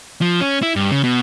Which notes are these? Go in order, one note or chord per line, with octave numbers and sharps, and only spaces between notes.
F3
C#4
E4
G2
C#3
B2